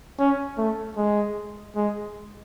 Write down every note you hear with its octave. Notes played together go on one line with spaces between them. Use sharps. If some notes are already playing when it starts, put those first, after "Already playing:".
C#4
A3
G#3
G#3